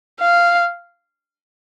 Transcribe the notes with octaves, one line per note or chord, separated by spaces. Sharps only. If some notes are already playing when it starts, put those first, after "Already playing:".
F5